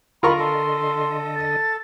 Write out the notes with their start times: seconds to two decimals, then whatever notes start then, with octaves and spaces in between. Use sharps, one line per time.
0.23 D3 F4 A#4 D#5 B5 C#6
0.39 A4 C6
1.36 A6